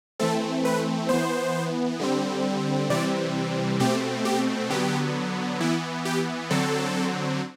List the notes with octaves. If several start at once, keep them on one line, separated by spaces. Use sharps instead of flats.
E3 A3 C4 A4
B4
E3 B3 C5
D3 G3 C4
C3 E3 G3 C4 D5
B2 A3 C4 G4
G4
D3 F#3 B3 G4
E3 B3 E4
G4
D3 F#3 C4 A4